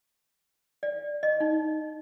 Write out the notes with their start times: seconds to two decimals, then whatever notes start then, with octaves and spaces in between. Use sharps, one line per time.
0.83 D5
1.23 D#5
1.40 D#4